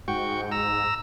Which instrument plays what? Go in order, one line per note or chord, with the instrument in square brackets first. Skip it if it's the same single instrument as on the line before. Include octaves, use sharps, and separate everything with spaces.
[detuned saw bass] G#2 [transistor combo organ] F#4 G5 C#6
[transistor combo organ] A#5 E6